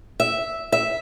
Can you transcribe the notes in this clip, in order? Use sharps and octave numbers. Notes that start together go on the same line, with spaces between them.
E5
E5